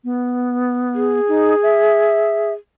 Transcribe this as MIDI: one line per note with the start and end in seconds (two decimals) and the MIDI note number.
0.04 1.20 59
0.95 2.52 68
1.28 1.55 63
1.63 2.53 76